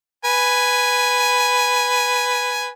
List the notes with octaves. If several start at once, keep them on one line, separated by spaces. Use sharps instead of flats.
B4 G#5